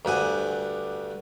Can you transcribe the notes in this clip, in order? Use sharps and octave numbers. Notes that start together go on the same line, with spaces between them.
D2 G2 F#5 G#5